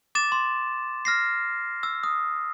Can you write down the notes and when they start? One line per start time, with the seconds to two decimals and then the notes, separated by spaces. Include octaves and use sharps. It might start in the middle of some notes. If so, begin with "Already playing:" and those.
0.15 D6 A6 E7
0.32 C6
1.05 F6 A#6 C7
1.83 E6
2.03 D#6